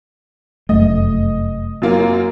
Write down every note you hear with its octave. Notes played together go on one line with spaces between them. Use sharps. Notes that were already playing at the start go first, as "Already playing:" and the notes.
F1 F#2 A3 D#5
F#2 A#3 F4